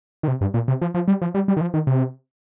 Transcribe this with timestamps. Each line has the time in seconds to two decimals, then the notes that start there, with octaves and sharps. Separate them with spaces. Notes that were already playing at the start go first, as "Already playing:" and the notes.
0.23 D#3
0.28 C3
0.41 G2
0.54 A#2
0.68 C3
0.82 F3
0.94 F3
1.08 G3
1.22 F3
1.34 G3
1.48 G3
1.57 D#3
1.61 F3
1.74 D#3
1.87 C3